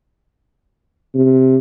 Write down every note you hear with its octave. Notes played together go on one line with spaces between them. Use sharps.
C3